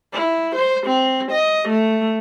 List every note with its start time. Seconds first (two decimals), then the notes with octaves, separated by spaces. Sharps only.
0.13 E4
0.56 C5
0.87 C4
1.31 D#5
1.68 A3